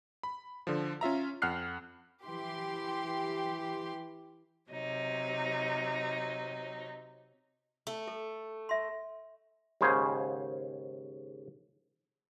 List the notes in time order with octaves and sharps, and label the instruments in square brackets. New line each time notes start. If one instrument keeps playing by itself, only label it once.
[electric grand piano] B5
D3 F3
C#4 F4 E5 A#5
F2 F#5 F6 F#6 C7
[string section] E3 G4 C6
[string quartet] C3 F#3 D#4 C#5
[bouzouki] A3
[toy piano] A4
E5 C6
[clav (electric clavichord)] D#2 G#2 C#3 C5 G#5